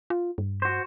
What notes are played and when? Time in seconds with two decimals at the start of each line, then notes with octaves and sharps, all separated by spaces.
0.10 F4
0.38 G2
0.62 F#4 C5